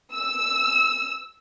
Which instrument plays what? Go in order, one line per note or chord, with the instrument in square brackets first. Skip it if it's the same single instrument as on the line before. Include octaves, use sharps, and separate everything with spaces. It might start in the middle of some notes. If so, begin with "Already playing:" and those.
[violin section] E6